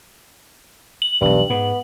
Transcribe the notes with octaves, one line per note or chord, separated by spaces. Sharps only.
F#7
E1 B1 G2
G#2 B3